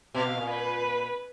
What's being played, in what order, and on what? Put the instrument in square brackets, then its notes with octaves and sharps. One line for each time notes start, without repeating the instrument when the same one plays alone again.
[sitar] B2 [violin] F5
[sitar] B2
A#2
[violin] B4